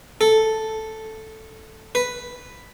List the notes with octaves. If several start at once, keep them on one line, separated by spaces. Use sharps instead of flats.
A4
B4